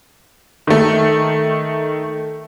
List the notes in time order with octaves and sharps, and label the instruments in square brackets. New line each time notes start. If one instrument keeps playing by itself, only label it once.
[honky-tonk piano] D#3 A3